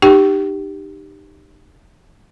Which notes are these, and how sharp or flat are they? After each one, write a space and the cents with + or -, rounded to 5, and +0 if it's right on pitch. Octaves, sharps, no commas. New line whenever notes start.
D#4 -30 G4 +0 G5 -40